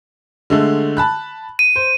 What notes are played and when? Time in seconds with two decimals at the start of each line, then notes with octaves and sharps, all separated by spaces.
0.50 D3 G#3 A3
0.97 A5 B5 F#6
1.59 D#7
1.76 C5